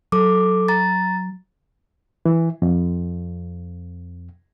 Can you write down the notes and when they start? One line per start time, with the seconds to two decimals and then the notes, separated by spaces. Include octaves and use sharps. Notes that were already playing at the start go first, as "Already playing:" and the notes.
0.12 F#3 A4 D6
0.68 A#5 A6
2.26 E3
2.62 F2